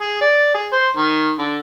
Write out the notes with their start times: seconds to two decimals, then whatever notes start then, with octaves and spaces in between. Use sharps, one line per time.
0.01 G#4
0.21 D5
0.54 G#4
0.73 C5
0.96 D#3
1.38 D3